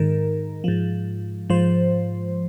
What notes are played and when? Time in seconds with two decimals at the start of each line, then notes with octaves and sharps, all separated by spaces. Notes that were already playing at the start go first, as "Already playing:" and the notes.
Already playing: G#2 D#3 A#4
0.64 G#2 F3
1.50 G#2 F3 C5